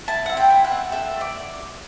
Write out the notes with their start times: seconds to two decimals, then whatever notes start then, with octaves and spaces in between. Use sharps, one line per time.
0.08 E4 A5
0.26 C4 F#5
0.37 G5
0.50 E4
0.65 F#5
0.71 C4
0.92 A4 E5
1.14 A3
1.21 D5